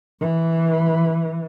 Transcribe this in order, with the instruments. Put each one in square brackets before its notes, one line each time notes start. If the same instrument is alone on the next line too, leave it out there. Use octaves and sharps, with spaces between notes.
[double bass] E3